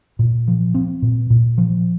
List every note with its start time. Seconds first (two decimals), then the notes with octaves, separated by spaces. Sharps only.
0.19 A#2
0.48 F3
0.74 C4
1.02 A#2
1.30 A#2
1.58 F3